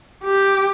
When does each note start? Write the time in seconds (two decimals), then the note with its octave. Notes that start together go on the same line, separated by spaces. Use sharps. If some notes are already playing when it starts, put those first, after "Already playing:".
0.24 G4